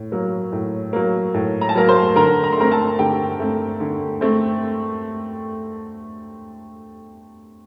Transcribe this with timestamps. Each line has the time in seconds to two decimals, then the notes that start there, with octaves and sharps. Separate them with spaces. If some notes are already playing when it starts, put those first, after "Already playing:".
Already playing: A2
0.12 F#3 A#3
0.52 A2
0.93 F#3 A#3
1.34 A2
1.61 A#5
1.69 A5
1.75 F#3 A#3 A#4 A#5
1.88 C5 C6
2.16 D3 A#4 A#5
2.44 A#5
2.53 C6
2.57 A3 C4 A#4 A#5
2.71 A4 A5
2.99 D3 G4 G5
3.40 A3 C4
3.80 D3
4.21 A3 C4